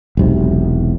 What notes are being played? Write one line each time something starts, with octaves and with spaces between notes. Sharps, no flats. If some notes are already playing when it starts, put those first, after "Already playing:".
E1 B1 C3